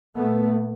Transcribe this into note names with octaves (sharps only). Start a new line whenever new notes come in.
A#2 A3 B3